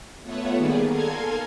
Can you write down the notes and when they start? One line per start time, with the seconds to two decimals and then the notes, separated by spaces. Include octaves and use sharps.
0.23 A3 B3 F4 C#5 E5 F#5
0.57 D#3 G3 A#3 B3 G#4 D5
0.90 A4 A#4 F5 G#5 C6 G#6